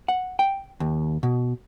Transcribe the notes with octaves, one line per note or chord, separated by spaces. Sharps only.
F#5
G5
D#2
B2